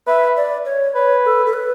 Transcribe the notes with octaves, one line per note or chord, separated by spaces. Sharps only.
B4 E5
D5
C#5
B4 C#5
A4
A4
B4